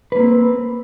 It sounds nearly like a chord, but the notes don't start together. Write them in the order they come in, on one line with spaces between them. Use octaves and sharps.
B4 A#3 C4